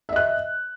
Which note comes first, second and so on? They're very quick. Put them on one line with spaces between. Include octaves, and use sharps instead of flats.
E5 D#5 F#6